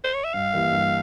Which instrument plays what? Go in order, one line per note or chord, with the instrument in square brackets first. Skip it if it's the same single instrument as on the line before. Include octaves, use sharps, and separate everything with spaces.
[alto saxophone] C5
C#5
E5
[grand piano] G2 [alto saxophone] F5
[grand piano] E3 A#3 E4 G4
G2